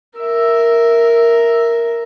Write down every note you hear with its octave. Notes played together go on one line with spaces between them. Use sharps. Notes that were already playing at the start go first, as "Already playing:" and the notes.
A#4 E5